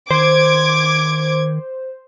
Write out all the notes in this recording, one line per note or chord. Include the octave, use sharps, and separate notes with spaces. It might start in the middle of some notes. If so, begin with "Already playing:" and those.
D#3 C5 D6 G#6